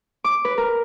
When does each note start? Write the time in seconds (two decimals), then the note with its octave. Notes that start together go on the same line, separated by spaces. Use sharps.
0.24 D6
0.45 B4
0.58 A#4